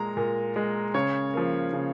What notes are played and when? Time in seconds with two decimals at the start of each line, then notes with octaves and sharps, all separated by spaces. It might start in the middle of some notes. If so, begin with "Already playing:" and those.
Already playing: A#2 G#3 A#5
0.17 A#2
0.56 G#3
0.94 C#3 C#5
1.34 F3 A#3
1.73 C#3